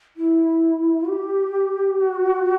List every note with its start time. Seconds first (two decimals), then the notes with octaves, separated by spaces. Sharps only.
0.17 E4
1.09 G4
2.00 F#4